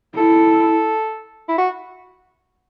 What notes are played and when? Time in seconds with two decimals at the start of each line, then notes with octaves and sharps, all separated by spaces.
0.17 E4 A4
1.49 E4
1.58 F#4